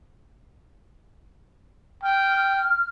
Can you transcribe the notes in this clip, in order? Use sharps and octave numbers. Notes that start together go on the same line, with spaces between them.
G5 F6